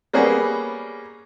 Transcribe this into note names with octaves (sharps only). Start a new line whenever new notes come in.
G3 A#3 B3 C#4 G#4